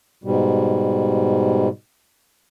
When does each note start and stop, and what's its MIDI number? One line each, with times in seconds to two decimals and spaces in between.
0.24 1.69 44
0.24 1.69 47
0.24 1.69 55